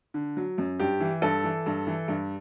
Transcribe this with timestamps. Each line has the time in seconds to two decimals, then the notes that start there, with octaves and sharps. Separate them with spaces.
0.14 D3
0.37 F#3
0.58 F#2
0.80 G2 G4
1.00 E3
1.22 G2 A4
1.44 E3
1.66 G2
1.87 E3
2.08 G2